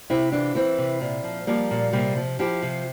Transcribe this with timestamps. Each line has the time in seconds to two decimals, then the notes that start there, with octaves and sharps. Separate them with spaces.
0.10 C3 C4 E4
0.32 E3 D4 F4
0.55 E3 C4 E4
0.78 C3
1.01 A#2
1.24 F3
1.47 F3 G3 A#3
1.71 A#2
1.93 C3 G3 A#3
2.17 F3
2.39 F3 E4 G4
2.62 C3